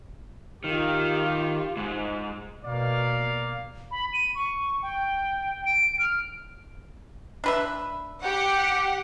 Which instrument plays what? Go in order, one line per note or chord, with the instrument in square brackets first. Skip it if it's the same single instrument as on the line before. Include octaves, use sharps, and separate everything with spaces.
[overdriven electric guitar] D#3 [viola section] F4 G4
[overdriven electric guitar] G#2
[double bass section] B2 [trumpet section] A#3 D5 F5
[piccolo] B5
D#7
C#6
G5
D7
F6
[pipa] D4 B4 E5
[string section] G4 F#5